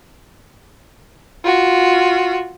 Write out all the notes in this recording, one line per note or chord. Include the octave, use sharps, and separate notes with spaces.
F4 F#4